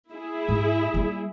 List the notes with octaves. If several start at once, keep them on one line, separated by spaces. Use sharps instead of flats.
E4 G#4
G#2
G3 A#3